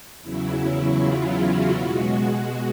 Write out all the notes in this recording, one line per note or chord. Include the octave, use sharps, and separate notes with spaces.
E2 C#3 F#3 E4
E4
F4
F#4
B2 G#3 F#4
F#4